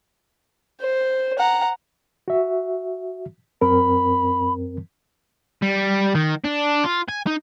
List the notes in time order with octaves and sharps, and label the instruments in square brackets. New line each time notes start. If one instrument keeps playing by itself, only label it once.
[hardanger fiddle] C5
F#5 A#5
[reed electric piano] F#4 E5
[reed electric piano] F#2 C4 A#4 [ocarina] B5
[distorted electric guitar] G3
D#3
D4
F4
G#5
D#4